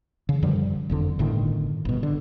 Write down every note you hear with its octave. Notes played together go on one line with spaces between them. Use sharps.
C#3
F#2 D3 F3 G3
F#1 F2 D3
G1 A2 D3 D#3
G1 B2
D3